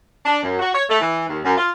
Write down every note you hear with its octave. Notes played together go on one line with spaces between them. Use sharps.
D4
F#2
F#4
C#5
A3
E3
D#2
F#2
F4